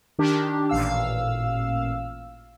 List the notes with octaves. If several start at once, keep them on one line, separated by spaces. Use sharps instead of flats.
D#3 D4 G4
A1 A#2 F5 E6